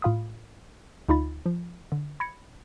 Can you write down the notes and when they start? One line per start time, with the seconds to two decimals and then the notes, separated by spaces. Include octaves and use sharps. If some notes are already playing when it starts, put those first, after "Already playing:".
0.02 A2 F4 F5 B5 D#6
1.09 D2 D#4 F4 B5 A6
1.46 F3
1.92 D3
2.20 B5 G#6 A#6 C#7